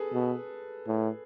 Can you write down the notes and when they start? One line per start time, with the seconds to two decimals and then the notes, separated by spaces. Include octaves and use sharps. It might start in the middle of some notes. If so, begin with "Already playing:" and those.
Already playing: G#4 A4 B4
0.13 B2
0.87 A2